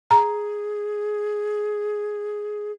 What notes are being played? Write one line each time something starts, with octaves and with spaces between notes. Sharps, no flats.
G#4 A#5